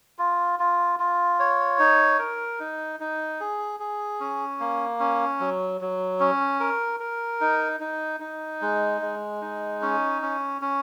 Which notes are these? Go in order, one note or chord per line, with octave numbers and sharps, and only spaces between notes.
F4
F4
F4
C#5
D#4
A#4
D#4
D#4
G#4
G#4
C#4
A#3
C#4
F#3
F#3
C#4
A#4
A#4
D#4
D#4
D#4
G#3
G#3
D#4
C#4
C#4
C#4